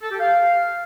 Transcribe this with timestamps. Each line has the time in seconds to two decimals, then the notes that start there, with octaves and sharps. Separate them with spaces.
0.02 A4
0.11 G4
0.19 F5